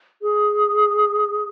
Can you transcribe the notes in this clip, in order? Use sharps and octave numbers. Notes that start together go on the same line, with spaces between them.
G#4